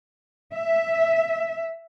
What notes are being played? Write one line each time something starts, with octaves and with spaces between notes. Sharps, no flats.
E5